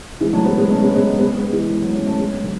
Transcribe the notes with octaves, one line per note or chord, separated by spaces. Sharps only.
E3 G#3
F#3 A3
G#3 B3
G#3 B3
A3 C#4
G#3 B3
G#3 B3
G#3 B3
G#3 B3
E3 G#3
F#3 A3
A3 C#4
A3 C#4
G#3 B3
D3 F#3